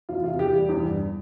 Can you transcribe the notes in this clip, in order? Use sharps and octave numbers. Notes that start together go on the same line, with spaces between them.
E2 F4
C3 F4
E2 G4
G3
E2
G2